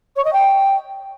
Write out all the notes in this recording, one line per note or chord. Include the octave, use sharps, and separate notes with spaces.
C#5
D#5
G5